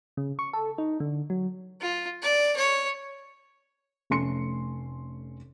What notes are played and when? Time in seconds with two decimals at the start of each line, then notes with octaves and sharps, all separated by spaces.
0.17 C#3
0.39 C#6
0.53 A4
0.78 D#4
1.00 D3
1.30 F#3
1.82 F4
2.22 D5
2.56 C#5
4.10 F1 A3 C#4 C6 C#7